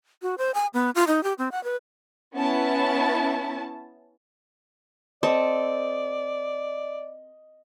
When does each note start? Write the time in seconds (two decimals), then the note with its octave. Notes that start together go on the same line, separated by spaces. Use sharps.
0.22 F#4
0.38 C5
0.54 G#5
0.74 B3
0.95 F4
1.07 D#4
1.24 G4
1.38 C4
1.52 F#5
1.64 B4
2.35 B3 C#4 E4 A5
5.23 C4 A4 D5 D#5